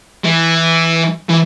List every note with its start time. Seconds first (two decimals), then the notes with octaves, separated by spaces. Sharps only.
0.25 E3
1.29 E3